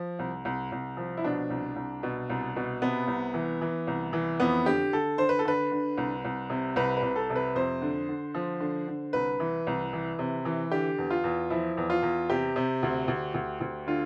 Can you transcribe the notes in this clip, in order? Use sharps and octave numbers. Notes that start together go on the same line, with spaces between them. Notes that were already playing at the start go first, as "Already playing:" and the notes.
Already playing: F3
C2
C2
C2
F3
E4
B2 D4
C2
C2
B2
C2
B2
C3 B3
C2
E3
E3
C2
E3
F2 B3
D3 G4
D3 A4
D3 C5
B4
A4
D3 B4
D3
C2
C2
C3
C2 B4
B4
C2
A4
C3
B4
F2 C5
D3
D3
F3
D3
D3
C2 B4
E3
C2
E3
C3
E3
D3 G4
E2
F4
E2
F3 E4
E2
F4
E2
C3 G4
C3
D2
D2
D2
D2
D3 F4